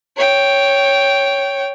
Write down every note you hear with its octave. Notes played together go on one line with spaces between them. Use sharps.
C#5 G5